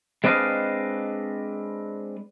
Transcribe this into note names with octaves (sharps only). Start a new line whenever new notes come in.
G#3 C4 D4 B4 D#5 F5